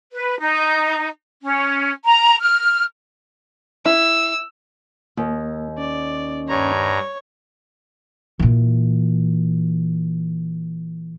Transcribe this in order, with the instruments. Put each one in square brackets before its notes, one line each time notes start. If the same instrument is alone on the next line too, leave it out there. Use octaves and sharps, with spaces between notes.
[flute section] B4
D#4
C#4
A#5
F6
[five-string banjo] E4 [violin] E6
[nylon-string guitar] D#2 [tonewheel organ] A#3
[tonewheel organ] C#4 [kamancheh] D5
[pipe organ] G2 A#5 [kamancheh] C#5
[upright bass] A#2 E3